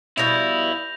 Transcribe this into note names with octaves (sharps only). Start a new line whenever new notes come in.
B2 F3 G3 E4 G6 A#6 F7